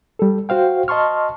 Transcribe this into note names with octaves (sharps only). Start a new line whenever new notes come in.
G3 A4
F#4 C5 F5 G5
D#5 A5 C6 C#6 F6